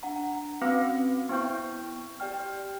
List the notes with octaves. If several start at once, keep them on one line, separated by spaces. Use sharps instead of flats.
D4 F#5 A#5
C4 C#4 F#4 B4 F5 F#5
B3 E4 C5 G5 C#6 G6
G4 D5 G5 F6